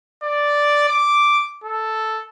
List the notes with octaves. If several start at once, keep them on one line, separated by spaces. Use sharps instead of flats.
D5
D6
A4